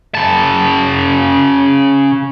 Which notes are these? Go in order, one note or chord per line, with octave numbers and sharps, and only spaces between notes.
C#3 A5